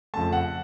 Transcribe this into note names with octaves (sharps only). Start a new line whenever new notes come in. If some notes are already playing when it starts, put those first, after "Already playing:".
F2 C#3 A3 A5
F#5